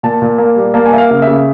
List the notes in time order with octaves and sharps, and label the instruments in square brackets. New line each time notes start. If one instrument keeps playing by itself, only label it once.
[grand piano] A#2 A5
A#2
A#3
G3
A#3 A5
G#5
A#3 E5
F5
C#3 F5
C#3 E5